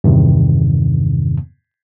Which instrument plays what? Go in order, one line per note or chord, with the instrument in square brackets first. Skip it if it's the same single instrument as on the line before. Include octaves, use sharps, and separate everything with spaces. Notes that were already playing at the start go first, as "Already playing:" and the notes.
[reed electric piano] E2 G2 C3 D#3